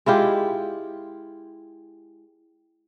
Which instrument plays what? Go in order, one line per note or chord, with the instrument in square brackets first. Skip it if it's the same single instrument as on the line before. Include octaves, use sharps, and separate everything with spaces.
[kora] G#3 E4 F4 G4